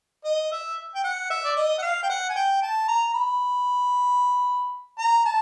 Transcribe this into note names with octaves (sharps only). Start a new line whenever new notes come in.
D#5
E5
G5
F#5
E5
D5
D#5
F#5
F5
G5
F#5
G#5
G5
A5
A#5
B5
A#5
A5